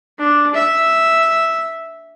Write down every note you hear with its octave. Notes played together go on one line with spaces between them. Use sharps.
D4
E5